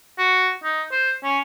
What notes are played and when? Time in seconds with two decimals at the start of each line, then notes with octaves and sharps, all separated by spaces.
0.18 F#4
0.64 D#4
0.92 C5
1.24 C#4